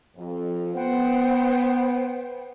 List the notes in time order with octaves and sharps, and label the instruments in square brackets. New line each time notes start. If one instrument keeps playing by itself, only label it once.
[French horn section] F2
[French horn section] B3 [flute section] C5 F#5 G5